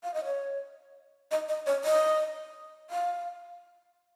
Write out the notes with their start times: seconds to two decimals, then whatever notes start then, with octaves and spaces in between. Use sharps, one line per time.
0.03 F5
0.14 D#5
0.25 C#5
1.31 D#5
1.48 D#5
1.66 C#5
1.85 D#5
2.90 F5